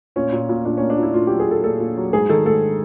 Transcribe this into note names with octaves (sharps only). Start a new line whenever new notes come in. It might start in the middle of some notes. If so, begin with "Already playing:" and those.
A#2 C#4
A#2
A#2
A#2 D4
C#4
A#3
D4
A#2 E4
A#2 F4
G4
F#3
G#4
A#2 A4
A#2 A4
A#2
F#3
G#2 G#4
D#3 A4
G#2 A4